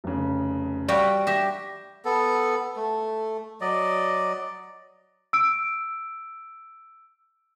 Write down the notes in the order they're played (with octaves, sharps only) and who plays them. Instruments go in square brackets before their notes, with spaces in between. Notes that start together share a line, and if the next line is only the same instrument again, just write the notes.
[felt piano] F1 C#3
[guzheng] G3 F#4 G5 [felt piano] D5 F5
[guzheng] G4 E5 [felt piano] A#6
[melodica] B3 A4
A3
F#3 D5 D#5
[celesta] E6 D7